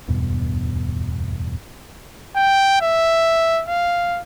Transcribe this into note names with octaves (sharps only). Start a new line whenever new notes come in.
D1 E2 G2 B2
G5
E5
F5